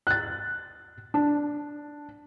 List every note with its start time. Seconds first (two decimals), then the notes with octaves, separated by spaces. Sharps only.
0.07 F#6 A6
1.14 D4